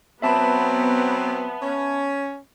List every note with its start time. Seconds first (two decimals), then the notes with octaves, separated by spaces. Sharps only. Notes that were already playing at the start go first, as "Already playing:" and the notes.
0.22 F#3 B3 C4 E5 A5 B5
1.62 C#4